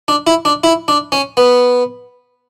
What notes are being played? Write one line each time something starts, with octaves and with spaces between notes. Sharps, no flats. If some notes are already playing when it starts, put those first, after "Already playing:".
D4
E4
D4
E4
D4
C#4
B3